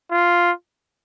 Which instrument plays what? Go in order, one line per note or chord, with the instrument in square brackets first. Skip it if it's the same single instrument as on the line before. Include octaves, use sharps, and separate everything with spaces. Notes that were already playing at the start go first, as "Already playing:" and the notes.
[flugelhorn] F4